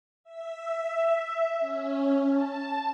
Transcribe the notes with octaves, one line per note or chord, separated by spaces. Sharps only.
E5
C#4
A5